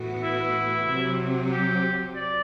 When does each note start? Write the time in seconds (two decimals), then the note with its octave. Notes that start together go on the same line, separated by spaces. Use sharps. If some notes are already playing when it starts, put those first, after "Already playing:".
Already playing: A2 E3 B3 F#4
0.24 E4
0.87 C3 F#3 C4
1.52 G4
2.16 D5